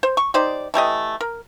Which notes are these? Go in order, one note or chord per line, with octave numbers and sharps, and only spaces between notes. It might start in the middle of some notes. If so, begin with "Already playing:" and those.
C5
C#6
D#4 G4 C5 D5
E3 A3 G4 D#5
A#4